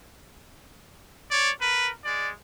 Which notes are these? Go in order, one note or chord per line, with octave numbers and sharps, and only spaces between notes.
C#5 D5
A#4 B4
G#3 D5